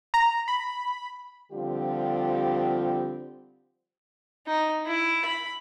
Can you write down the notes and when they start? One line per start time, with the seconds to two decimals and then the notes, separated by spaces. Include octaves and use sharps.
0.14 A#5
0.48 B5
1.52 D3 F3 G3 C4 F4 G4
4.46 D#4
4.86 E4
5.25 B5